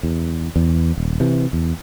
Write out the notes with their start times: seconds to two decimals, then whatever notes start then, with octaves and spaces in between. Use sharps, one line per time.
0.03 E2
0.56 E2
0.98 D#1
1.20 C3 E3
1.53 E2